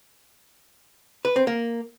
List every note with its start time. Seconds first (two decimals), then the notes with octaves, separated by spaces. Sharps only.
1.25 B4
1.36 C4
1.47 A#3